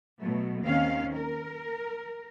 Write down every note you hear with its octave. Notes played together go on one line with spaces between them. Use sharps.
B2 F#3 A3
D#2 D#3 C4 C#4 F5
A#4